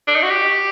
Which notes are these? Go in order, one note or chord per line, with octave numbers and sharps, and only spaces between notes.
D4
D#4
F#4
G4